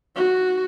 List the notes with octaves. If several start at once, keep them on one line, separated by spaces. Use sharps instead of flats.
F#4